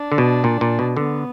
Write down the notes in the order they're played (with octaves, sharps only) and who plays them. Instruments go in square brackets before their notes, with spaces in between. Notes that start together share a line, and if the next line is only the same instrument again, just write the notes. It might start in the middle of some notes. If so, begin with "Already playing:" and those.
Already playing: [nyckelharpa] D4
[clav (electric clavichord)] D3
B2
A#2
A#2
B2
[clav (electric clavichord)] D3 [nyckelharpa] B3